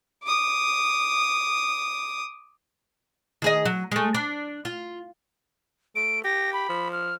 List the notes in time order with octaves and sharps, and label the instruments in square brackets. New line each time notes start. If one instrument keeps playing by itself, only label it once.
[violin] D6 D#6
[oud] D#3 G#4 D#5
F#3
G#3 A3
D4
F4
[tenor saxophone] A3 [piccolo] D7
[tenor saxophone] G4 [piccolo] A#6
[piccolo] B5
[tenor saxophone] F3
[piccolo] F6